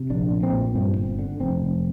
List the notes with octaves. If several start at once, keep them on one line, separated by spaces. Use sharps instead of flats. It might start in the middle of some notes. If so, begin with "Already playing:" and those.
Already playing: C3
A#1 D4
A#2
C4
A#2
G2 C4
G1
D3
F1 C4
F1